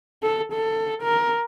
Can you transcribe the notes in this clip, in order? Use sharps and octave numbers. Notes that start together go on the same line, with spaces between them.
A4
A4
A#4